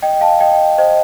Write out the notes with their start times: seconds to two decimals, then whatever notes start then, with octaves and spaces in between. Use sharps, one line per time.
0.02 D#5 G5
0.21 F5 A5
0.40 D#5 G5
0.78 C5 D#5